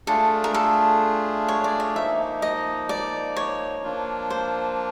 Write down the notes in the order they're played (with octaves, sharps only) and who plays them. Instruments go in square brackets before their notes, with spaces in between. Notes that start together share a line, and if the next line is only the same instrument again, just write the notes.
[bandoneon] A3 D4 F4 G#4 [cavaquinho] A4
[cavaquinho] A#4
A4
C#5
D5
C#5
[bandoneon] F3 A#3 D#4 [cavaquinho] E5
[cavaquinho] D#5
D5
C#5
[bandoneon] F3 A#3 D4 F4
[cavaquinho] C5